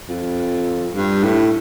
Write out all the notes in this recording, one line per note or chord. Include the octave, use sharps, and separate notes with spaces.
F2
G2
A2